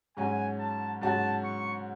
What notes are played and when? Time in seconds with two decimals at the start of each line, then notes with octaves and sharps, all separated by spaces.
0.17 G#2 F#3 C#4 F#4 G#5
0.59 A5
1.01 G#2 F#3 C#4 F#4 A5
1.44 C#6